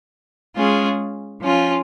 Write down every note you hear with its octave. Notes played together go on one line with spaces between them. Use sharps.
G#3 C#4 F4 G#4
F3 C#4 F4